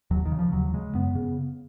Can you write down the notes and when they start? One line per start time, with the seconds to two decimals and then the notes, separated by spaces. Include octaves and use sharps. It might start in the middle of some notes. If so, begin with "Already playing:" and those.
0.11 D#2 F#3
0.25 D#3
0.32 C#3
0.39 F3
0.53 D#2 F#3
0.74 C#3 G#3
0.94 F#2 B3
1.15 C#3